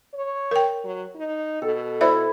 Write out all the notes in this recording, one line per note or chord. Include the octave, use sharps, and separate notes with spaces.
C#5
A#4 G5
F#3
D#4
B2 A4
E4 C5 D5 E5